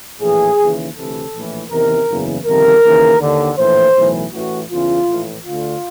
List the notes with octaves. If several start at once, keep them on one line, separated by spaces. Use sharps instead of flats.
A#1 A2 E3 G#4
D#2 C#3 E3
D2 C3 E3 A4
A#1 A2 E3
E2 C3 D#3 A#4
F#1 E2 C#3 E3
G1 F2 C3 D#3 A#4
D#2 C#3 E3
D#2 D3
A#1 A2 E3 C5
B1 A2 E3
A1 A2 E3 F#4
E2 C#3 E3 F4
A#1 A2 E3
D2 D3 F4